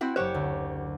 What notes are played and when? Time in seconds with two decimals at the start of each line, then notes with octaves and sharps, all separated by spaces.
0.01 C4 E4 F#4
0.16 F#1 G4 C5 C#5 F#5 E7
0.34 D2